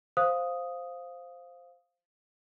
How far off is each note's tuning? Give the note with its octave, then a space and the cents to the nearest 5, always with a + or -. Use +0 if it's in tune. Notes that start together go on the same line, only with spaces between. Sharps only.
C5 +0 F5 +0 D#6 +0